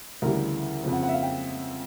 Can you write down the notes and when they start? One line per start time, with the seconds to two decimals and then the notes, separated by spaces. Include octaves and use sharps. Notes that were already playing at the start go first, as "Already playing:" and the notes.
0.22 D2 C#3 E3 G3 A#4
0.83 F2 C#3 F3
0.93 F#5
1.03 F#5
1.09 E5
1.13 F5
1.23 G5